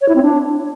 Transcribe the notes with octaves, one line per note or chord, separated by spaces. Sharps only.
C#5
E4
C4
D4